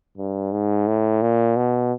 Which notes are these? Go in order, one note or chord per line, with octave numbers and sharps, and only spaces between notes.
G2
G#2
A2
A#2
B2